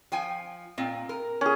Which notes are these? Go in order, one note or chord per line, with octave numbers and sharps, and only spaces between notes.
F3 G5 G#5
A#2 C4
A#4
C#4 G#4